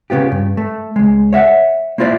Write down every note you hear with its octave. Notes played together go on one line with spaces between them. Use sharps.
C#3 B3 F4 G4
G2
A3
C#2 G#3
C#5 E5 F#5
A#3 E4 F4 C5 D5